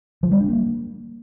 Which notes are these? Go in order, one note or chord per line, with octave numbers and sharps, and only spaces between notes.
F3
G3
D4
A#3